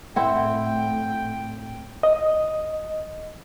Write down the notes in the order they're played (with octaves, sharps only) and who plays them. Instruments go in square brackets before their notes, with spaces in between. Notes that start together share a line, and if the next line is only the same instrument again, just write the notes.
[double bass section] A2 [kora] C4 E4 [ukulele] F#5 [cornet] G5
[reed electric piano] D#5